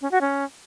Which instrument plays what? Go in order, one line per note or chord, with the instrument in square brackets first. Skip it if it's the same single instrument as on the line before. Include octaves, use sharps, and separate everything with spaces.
[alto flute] C#4
F#4
C#4